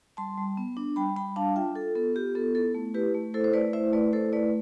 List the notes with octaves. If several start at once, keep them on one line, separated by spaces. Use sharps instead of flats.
G3 A5 C6
G3
B3
D4
G3 G5 B5
G3 G5 B5
D4 F5 A5
F4 E5 G5
F4 A4
B3 A4
F4 G4
B3 A4
E4 A4
A3
E4 G4 B4
A3
E4 A4 C5
C5
A3 B4 D5
E4 C5 E5
A3 B4 D5
E4 A4 C5
A3 B4 D5